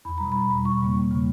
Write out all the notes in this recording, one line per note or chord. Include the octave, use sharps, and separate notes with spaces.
E2 B5
B2 G3 A#5
E2 B5
B2 G3
E2 C#6
C#3 G3 A#3
E2
C#3 G3 A#3